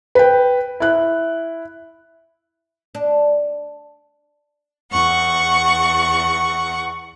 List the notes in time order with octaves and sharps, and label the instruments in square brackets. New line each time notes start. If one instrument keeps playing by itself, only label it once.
[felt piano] B4 G5
E4 F#6
[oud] D4
[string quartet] E2 F#5 C#6